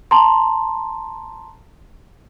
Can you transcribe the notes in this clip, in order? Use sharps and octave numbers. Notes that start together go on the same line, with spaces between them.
A5 A#5 C6